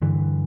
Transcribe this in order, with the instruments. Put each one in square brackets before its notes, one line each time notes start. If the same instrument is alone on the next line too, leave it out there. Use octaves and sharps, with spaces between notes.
[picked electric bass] G2 D3 E3